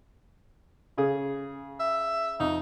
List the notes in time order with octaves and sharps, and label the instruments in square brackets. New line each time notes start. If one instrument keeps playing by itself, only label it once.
[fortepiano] C#3 G#4
[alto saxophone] E5
[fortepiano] F2 [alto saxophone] D#4